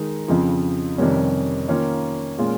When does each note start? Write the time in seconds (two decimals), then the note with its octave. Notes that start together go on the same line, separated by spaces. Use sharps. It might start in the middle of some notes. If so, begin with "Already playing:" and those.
Already playing: D#3 G#3 D#4
0.28 F2 C#3 F3
0.98 F2 C3 D#3 G3 C#4
1.68 D#3 A#3 C#4 F4
2.38 A#2 G#3 C#4 F4